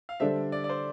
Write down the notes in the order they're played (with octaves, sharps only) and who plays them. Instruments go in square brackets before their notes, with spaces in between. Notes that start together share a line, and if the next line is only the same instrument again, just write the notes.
[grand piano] F5
[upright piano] D3 G3 D4 A4 C5 [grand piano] E5
[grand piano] D5
D5
C5